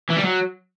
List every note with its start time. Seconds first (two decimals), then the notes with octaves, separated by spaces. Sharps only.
0.10 E3
0.17 G3
0.24 F#3